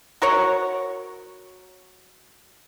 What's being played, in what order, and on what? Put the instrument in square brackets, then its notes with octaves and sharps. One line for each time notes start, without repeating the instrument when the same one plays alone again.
[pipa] F#4 A#4 C#5 F#5